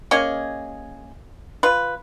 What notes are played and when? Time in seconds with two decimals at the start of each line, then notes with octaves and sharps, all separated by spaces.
0.11 A#3 C#4 G#4 D#5
1.63 F4 B4